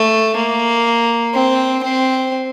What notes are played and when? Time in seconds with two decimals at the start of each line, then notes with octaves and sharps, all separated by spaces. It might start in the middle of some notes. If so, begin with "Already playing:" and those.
Already playing: A3
0.36 A#3
1.34 C4
1.83 C4